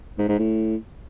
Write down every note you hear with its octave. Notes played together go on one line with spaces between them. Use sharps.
G#2
G#2
A2